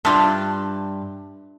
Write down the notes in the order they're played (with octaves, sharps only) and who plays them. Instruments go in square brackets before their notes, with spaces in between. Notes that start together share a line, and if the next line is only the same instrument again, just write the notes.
[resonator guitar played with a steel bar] G2 [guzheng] D4 F4 E5